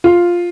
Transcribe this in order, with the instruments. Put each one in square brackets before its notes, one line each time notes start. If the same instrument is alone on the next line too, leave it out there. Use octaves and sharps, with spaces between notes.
[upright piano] F4